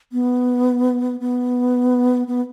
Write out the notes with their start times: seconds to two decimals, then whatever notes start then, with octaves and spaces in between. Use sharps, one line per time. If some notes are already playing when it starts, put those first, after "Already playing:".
0.12 B3
1.20 B3
2.27 B3